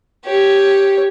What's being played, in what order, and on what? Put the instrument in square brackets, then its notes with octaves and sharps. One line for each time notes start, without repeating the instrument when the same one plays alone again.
[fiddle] G4 C#5